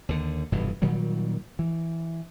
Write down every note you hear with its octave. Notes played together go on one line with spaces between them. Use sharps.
D#2 D3
F1 G2 B2 E3
A#2 D#3 F#3 G3
E3